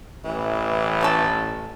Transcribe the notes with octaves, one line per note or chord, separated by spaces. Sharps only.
A1 E3
D3 C#4 A4